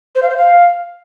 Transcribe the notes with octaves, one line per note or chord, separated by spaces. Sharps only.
C5
F5
C5
F5